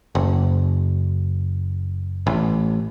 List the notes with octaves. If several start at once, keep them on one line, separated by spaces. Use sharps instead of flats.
F#1
A1